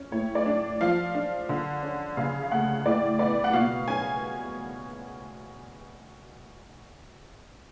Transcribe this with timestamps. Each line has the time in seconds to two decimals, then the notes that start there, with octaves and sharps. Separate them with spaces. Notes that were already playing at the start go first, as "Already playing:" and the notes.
Already playing: C#4
0.12 A2 C#5
0.35 D5
0.46 D4
0.81 F3 F5
1.15 D4
1.49 D3
1.82 C#4
2.17 C#3 F5
2.43 F5
2.51 A3 F#5
2.85 A2 D5
3.19 B3 D5
3.44 F#5
3.53 B2 F5
3.88 C#4 G#5